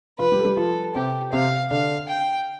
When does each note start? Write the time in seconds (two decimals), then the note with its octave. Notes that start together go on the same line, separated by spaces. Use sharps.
0.19 F3 F4 B4
0.32 G3 G4
0.40 A4
0.44 G3 G4
0.57 F3 F4 A4
0.95 C3 C4 G4
1.32 C3 C4 F5
1.70 D3 D4 F5
2.08 G5